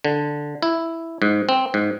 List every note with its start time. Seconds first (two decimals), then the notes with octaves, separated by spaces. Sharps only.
0.04 D3
0.62 E4
1.22 G#2
1.49 C4
1.74 G#2